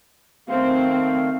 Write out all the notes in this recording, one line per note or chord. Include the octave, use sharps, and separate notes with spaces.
D#3 A3 C4 F5